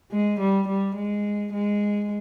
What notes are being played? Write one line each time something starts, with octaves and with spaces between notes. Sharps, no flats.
G#3
G3
G3
G#3
G#3